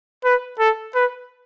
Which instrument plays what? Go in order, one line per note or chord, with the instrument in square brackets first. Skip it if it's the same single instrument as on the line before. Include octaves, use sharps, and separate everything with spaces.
[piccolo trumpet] B4
A4
B4